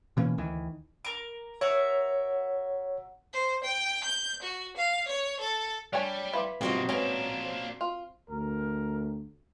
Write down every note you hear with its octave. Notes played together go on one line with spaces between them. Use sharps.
B2 E3 A#3 C#4
D2 D#3 E3
A#4 D6
F#4 A#4 C#5 E5
C5
G5
G6
F#4
F5
C#5
A4
G3 D4 C#5 G#5
E4 B4 F5 C6 D6
B1 G2 D#3 F3 A#3 C4 F#4 D#5
G#2 A#3 C#4 D4 B4 C#5 A#5
C5
F4
D2 A#4